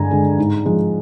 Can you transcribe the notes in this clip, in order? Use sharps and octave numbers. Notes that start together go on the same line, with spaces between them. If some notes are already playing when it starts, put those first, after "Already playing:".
Already playing: G2 D3 G#3 G#5 A#5
D3 G#3
G#2
F3 G#3